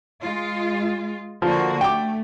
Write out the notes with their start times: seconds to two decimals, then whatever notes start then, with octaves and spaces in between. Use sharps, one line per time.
0.21 G#3 F4
1.42 D3 F3 A#3 F#4
1.81 A3 G5 D6